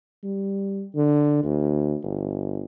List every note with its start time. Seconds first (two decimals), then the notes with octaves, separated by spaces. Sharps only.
0.23 G3
0.95 D3
1.44 D2
2.03 G1